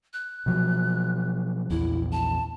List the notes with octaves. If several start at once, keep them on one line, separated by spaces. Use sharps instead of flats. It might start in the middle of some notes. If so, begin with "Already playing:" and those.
F#6
B2 F3 F#3
A#1 E2 E4
A5